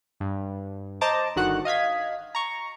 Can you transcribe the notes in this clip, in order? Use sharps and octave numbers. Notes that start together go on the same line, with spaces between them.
G2
C5 D#5 A5 A#5 D6
G1 D3 D#3 F#4 F#5 F#6
D#5 F5 G#6 B6
A#5 C#6